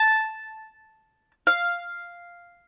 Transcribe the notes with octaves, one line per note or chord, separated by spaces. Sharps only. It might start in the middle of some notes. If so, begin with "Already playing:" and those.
Already playing: A5
F5